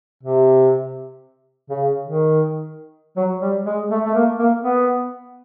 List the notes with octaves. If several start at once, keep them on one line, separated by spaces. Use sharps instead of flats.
C3
C#3
D#3
F#3
G3
G#3
A3
A3
A#3
A#3
B3